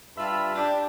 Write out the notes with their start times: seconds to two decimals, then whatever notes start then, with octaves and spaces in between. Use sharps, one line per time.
0.17 G2 G3 F4 E5 A5 B5
0.55 D4 G4